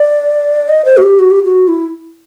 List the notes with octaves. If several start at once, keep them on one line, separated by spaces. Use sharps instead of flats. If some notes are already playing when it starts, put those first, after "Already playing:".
Already playing: D5
D#5
C5
F#4
G4
F#4
G4
F#4
E4